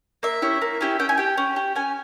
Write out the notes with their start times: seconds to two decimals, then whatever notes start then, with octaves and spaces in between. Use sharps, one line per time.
0.23 A#3 E5
0.42 C#4 E4 G4
0.62 A#3
0.81 C#4 E4 G4
0.99 C#4 G5
1.09 G#5
1.18 G4 G5
1.38 C#4
1.56 G4
1.75 C#4 G#5